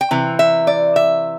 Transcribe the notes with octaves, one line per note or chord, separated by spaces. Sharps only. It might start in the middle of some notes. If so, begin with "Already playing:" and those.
G5
C3 E3
E5
D5
E5